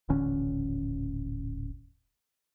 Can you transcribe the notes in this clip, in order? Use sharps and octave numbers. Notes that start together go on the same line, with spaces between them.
D#1 A1 D3 C#4